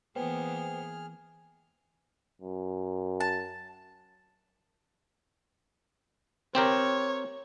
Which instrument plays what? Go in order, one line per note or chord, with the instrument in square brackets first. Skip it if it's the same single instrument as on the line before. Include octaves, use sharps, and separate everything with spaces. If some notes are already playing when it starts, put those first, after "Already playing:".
[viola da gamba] E3 A#3 B3 [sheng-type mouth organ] G#4 F6 [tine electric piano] B4 C5 G5
[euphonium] F#2
[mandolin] A5
[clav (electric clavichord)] C4 G4 A#4 [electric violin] C#5